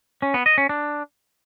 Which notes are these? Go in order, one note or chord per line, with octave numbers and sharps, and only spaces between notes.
C#4
B3
D#5
C#4
D4